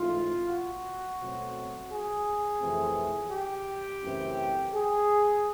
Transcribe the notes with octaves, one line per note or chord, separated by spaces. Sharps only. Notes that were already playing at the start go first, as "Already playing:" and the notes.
Already playing: G#2 E3 A3 C4 F4
F#4
B2 F#3 A3 C4
G#4
F2 C3 E3 A3 C4
G4
F#2 C#3 E3 A3 C4
G#4